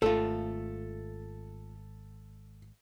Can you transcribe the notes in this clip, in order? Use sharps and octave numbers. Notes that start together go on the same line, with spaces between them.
G#1 A3 F4 A4